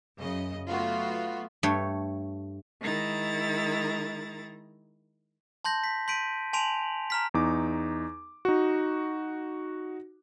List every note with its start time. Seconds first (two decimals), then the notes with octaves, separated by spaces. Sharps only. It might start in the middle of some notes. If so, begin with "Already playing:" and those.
0.19 F#2 C#3 D#5
0.67 F#3 A3 B3 F4 F#4
1.63 G2 A3 C#5 G5
2.80 D#3 G#3 E4 A#5 A6
5.65 A5 C6 G6 A#6
5.84 B6
6.08 C6 G6 B6 D7 D#7
6.53 G#5 A5 C6 D7 F7 F#7
7.10 A#5 F6 B6
7.34 E2 D#4 D6
8.45 D#4 F#4